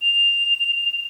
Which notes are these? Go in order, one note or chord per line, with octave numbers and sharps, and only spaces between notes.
F7